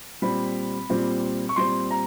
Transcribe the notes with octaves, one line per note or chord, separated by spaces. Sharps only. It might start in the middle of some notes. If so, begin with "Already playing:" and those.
A#2 G3 C4 B5
A#2 G3 C4
C#6
A#2 G3 C4 C6
A#5